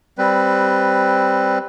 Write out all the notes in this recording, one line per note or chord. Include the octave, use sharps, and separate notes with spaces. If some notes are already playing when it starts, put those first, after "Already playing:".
G3 C4 B4